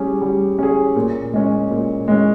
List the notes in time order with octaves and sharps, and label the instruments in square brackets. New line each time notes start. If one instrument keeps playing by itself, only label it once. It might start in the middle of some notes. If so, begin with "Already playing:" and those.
Already playing: [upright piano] G3 C#4 G#4
G3
C#4 G#4
A#2
G#3 C#4
A#2
G#3 C#4